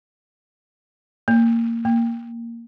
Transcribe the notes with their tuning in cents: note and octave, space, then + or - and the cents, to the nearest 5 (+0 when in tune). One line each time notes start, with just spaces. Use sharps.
A#3 -15
A#3 +0